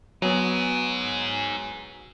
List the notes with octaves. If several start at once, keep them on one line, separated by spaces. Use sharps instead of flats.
F#3 B3 D#4 G#4